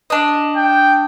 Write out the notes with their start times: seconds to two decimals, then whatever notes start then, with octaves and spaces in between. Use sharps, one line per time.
0.10 D4 D#5
0.57 G5